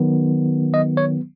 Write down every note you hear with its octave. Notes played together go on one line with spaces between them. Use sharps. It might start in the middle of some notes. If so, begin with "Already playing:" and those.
Already playing: D#3 F#3 B3
D#5
C#5